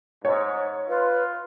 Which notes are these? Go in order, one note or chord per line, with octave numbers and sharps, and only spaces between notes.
G#2 C#5
F4 B4